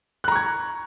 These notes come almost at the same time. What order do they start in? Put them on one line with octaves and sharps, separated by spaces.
F#6 A#5 C#6 G#6